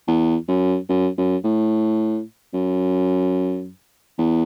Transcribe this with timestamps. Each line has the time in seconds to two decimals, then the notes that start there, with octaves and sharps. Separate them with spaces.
0.08 E2
0.48 F#2
0.89 F#2
1.18 F#2
1.44 A2
2.54 F#2
4.18 E2